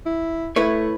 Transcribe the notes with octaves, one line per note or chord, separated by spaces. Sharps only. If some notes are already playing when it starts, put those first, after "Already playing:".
E4
A3 E4 B4 C#5